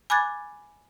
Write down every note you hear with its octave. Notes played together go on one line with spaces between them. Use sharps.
G#5 B5 D6 F#6 G#6 A6